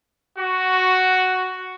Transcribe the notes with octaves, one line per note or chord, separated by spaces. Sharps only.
F#4